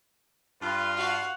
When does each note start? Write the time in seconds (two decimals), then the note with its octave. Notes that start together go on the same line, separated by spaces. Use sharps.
0.61 G2 F4 B4
0.97 F#4 F5 F#5